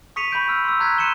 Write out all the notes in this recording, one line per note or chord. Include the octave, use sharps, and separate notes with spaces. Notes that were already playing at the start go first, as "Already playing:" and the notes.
C#6 D#6 B6 C#7 D#7 F7
B5 C#6 G6 D7
B5 E6 F6
C6 E6
A#5 F#6 G#6 B6
C6 F#6 C#7 D#7 E7 G7